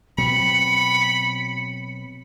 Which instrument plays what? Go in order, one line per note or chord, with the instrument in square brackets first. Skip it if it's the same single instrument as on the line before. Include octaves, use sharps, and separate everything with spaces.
[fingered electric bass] B2 F#3 C4 [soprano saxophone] B5 [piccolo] C#7